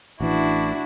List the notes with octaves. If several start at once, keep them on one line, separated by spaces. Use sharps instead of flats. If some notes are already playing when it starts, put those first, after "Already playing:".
A1 E3 D4 E4 F#4